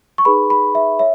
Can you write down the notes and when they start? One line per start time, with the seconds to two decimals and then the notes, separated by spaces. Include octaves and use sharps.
0.18 C#6
0.25 D#4 G#4 B4 B5
0.50 B5
0.75 E5
0.99 C#5 E5